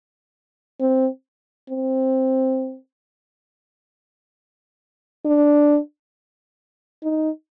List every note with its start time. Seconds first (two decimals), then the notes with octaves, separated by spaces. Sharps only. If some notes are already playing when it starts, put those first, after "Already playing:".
0.80 C4
1.70 C4
5.25 D4
7.03 D#4